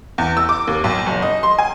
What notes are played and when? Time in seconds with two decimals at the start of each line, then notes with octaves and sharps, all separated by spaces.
0.18 E2
0.37 E6
0.49 D6
0.67 D#2
0.84 B1
1.06 F#1
1.22 D#5
1.43 C6
1.59 G#5